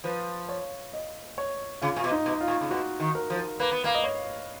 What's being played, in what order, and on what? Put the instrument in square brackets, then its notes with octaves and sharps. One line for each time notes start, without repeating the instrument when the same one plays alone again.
[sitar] F3 [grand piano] B4
[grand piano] C#5
D#5
C#5
[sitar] C#3 [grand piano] F4
[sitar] A#2
B2
[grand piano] D#4
[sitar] B2
[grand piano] F4
[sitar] A#2
C#3
[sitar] B2 [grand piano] F#4
[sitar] D#3
[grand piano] A#4
[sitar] F3
[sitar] A#3 [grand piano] B4
[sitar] B3
[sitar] A#3 [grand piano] F5
[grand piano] D#5
C#5